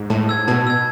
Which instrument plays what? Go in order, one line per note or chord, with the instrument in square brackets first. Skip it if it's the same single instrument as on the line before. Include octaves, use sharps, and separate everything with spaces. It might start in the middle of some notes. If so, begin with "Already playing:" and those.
Already playing: [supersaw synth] G#2
[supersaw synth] A2 [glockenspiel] A5
[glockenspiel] E6 G#6
[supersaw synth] B2 [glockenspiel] A5
[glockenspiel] E6 G#6